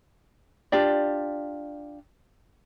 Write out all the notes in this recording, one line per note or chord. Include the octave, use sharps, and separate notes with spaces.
D4 F4 G4 D5